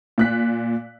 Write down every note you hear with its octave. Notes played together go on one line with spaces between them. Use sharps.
A#2 F#6 B6